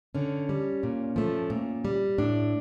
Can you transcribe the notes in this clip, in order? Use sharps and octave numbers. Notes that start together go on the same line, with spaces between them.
D3 C#4
G3
A#2
F3 A3
A#2
G3
A2 D4